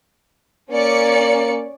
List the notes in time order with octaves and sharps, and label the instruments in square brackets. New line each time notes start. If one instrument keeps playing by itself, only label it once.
[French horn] A#3 [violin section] C#4 D5 C#7